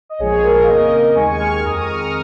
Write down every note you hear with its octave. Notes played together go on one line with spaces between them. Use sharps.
D#5
A#1 A#2 F3 G#3 G#4 C#5
A#4
F5
F2 C#3 A#3 A#4 D#5
D#2 D#3 G#3 G#5 C#6
C#6 F6
F2 D#3 G#3 A#5 D#6
C#6 F6
A#5 D#6